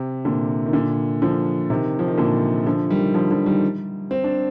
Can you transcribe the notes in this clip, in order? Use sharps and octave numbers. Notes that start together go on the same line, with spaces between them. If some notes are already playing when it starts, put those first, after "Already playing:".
Already playing: C3
A#2 D3
D#3
A#2 D3
D3 F3
C3 D#3
F3
D#3
A#2 D3
D3 F3
D#3 G3
D3 F3
D3 F3
D#3 G3
C4
D4